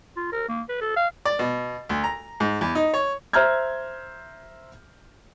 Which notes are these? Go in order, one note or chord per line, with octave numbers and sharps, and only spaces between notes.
F4
A#4
A#3
B4
A4
F5
D5
B2
D2
A#5
G#2
E2
D#4
C#5
C5 E5 A#5 F6 G6 G#6